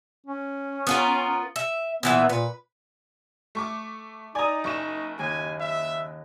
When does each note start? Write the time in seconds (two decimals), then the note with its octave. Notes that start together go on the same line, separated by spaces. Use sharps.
0.27 C#4
0.87 B3 F4 A#4
1.56 E5
2.03 A#2 E3 B3 E5
2.29 A#2 B4
3.55 A3 C#6 D6
4.35 D#4 D5 G#5 A#5 D#6
4.64 F#1 C#6 E7
5.19 D#2 G#5
5.60 E5